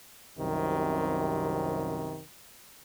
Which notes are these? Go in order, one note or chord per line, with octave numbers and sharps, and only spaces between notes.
C2 F#2 C3 D#3